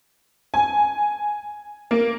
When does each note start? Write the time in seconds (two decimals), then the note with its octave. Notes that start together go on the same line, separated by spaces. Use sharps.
0.54 G#5
1.91 A#3